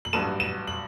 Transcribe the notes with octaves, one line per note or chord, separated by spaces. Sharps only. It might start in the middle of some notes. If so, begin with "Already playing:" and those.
F#7
A1 G2 F#3 E7
E7
F#7